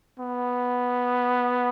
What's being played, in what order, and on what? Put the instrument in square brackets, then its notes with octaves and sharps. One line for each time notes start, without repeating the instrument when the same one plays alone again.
[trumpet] B3